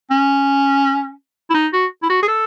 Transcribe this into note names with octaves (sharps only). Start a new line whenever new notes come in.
C#4
E4
D#4
F#4
E4
F#4
G#4
A4